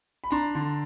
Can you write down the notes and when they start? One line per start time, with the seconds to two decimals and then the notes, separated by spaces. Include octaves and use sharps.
0.24 B5
0.31 D4 A#5 C6
0.55 D3